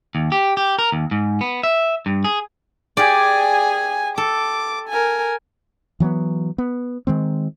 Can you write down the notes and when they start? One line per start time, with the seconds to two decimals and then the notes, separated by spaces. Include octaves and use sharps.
0.15 D#2
0.32 G4
0.57 G4
0.79 A#4
0.92 D#2
1.11 G#2
1.41 B3
1.63 E5
2.06 G2
2.24 G#4
2.97 G4 G#4 D5 G#5
4.18 A4 D6
4.89 A#4 G#5
6.00 E3 F#3 A3 B3
6.58 B3
7.07 D#3 G#3 C4